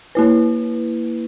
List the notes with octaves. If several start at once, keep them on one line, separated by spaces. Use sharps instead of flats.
A#3 E4 B4